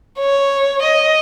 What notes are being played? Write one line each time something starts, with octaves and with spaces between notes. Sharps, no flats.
C#5
D#5